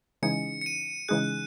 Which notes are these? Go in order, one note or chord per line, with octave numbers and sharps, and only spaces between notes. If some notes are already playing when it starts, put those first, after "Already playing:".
C#3 E3 G#3 D#4 G#4 C#7
C#7
D#7
C#3 E3 G#3 D#4 G#4 F#6